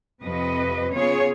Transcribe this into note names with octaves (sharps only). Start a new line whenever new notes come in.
F2 C3 B4 D#5
C#3 B3 F4 G#4 C#5